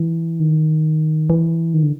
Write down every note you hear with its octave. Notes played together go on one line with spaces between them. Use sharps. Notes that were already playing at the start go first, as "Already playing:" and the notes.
Already playing: E3
D#3
E3
D#3
D3